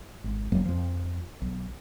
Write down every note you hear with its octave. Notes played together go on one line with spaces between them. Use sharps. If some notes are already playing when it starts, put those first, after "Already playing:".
G#1
F#1 F#2 F#3 A#3
F2 F3
B1